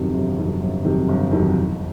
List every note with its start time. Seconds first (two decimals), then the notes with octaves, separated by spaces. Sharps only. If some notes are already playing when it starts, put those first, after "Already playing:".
Already playing: G1 F2 C3 D#3 F#3
0.14 G1
0.38 F2 C3 D#3 F#3
0.61 G1
0.84 F2 C3 D#3 F#3
1.08 G1
1.31 F2 C3 D#3 F#3
1.56 E1